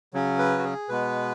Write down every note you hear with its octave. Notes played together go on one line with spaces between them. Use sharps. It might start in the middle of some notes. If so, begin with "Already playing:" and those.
C#3 F#3 C#4
B4
F#4
G#4
B2 G#3 B3 B4